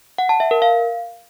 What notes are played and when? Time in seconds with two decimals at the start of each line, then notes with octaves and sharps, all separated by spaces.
0.18 F#5
0.29 A5
0.40 E5
0.51 A#4
0.62 F5